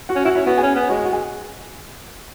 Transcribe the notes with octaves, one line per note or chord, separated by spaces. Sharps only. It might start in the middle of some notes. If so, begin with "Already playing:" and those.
F#4 F#5
C#4
E4 F#4 F#5
C#4 E4 E5
B3 F#4 F#5
G#4 G#5
C#4
B3
G#3 F#4 F#5
G#4 G#5
F#4 F#5
G#4 G#5